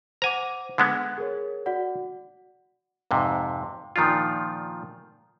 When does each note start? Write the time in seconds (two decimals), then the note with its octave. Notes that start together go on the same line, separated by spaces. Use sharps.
0.22 C5 F#5 G#5 A#5 D6
0.78 D3 G#3 B3 F#5 G#6 B6
1.18 G#4 A#4 C#5
1.66 F#4 D5 F#5
3.11 F2 G#2 C3
3.96 A#2 D#3 F3 D4 F4